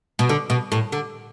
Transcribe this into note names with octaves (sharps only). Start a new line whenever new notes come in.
B2
D3
B2
A2
D3